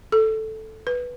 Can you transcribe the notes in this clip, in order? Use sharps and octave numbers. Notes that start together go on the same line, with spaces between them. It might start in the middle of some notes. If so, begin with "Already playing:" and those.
A4
B4